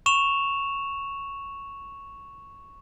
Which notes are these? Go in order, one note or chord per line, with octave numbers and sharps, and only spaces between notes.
C#6 E7 F7